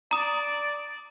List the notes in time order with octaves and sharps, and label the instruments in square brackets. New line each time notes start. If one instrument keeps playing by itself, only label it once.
[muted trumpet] D5 [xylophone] A#5 D#6 E7